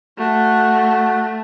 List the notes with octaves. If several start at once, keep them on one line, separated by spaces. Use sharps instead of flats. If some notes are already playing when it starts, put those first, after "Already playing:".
A3 F#4